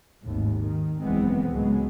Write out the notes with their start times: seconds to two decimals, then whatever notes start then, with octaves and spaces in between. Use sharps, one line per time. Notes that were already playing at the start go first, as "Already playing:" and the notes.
0.24 G#1 D#2 A2
0.63 D#3
1.01 F#1 E2 E3 G#3 B3 C4
1.52 C#2 A2 F#3 G#3 B3